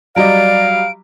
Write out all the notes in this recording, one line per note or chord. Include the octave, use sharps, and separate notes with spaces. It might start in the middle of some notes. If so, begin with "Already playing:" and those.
F#3 G3 D5 D#5 F5 D7